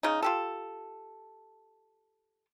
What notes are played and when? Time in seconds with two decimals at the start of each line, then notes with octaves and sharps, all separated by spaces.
0.03 C#3 D#4
0.22 F4 G4 A4